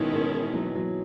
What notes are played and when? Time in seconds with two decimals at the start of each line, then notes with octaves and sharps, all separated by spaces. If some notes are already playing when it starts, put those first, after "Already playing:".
Already playing: B2 D#3 G#3 C#4 E4
0.14 B2
0.34 E3
0.54 F#3
0.75 F#3